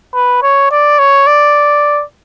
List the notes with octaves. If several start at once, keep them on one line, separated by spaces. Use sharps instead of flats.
B4
C#5
D5
C#5
D5